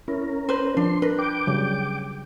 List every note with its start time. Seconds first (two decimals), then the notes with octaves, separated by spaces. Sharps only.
0.08 C#4 E4 A#4
0.49 B4 C5
0.77 F3 D4 C6
1.02 D4 A#4 B4
1.19 G5 D6
1.47 C#3 F#3 G3